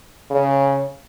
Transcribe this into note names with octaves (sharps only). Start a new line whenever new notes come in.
C#3